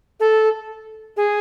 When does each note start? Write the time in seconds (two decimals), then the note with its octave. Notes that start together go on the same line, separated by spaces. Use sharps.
0.20 A4
1.17 G#4